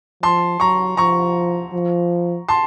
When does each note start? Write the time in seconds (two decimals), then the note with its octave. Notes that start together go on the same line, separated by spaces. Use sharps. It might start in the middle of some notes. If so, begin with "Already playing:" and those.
0.23 F3 A5 C6
0.60 F#3 A#5 C#6
0.97 F3 A#5 C#6
1.73 F3
2.48 A5 C6